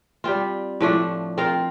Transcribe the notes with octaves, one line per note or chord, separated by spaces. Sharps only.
G3 C4 F4
A2 F3 A3 D4
C4 F4 A#4 F5